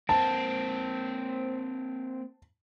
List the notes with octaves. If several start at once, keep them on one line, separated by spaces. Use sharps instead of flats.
A#3 C4 A5